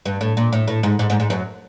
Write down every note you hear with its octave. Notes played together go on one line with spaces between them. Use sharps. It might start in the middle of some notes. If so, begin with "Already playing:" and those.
G2
A2
A#2
A2
A2
G#2
G#2
G#2
G#2
F#2